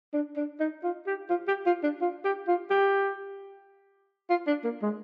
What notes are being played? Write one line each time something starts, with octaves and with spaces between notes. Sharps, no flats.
D4
D4
D#4
F4
G4
F4
G4
F4
D4
F4
G4
F4
G4
F4
D4
A#3
G#3